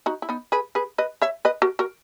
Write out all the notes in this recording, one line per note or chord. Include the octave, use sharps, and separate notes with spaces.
D#4 F#4
E4
B3 D#4
G#4 B4
G#4 B4
B4 D#5
C#5 E5
B4 D#5
F#4 A#4
F#4 A#4